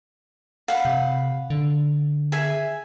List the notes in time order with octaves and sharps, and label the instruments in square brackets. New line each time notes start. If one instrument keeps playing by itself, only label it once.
[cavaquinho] F5 F#5 B5
[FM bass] C3
D3
[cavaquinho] G#4 E5 G#5